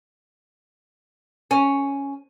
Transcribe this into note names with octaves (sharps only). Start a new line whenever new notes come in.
C#4